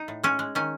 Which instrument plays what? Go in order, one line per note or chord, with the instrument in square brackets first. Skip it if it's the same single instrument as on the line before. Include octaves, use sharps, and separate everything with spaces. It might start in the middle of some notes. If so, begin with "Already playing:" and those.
Already playing: [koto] D#4
A2
G#3 C#4
G#3
D#3 C#4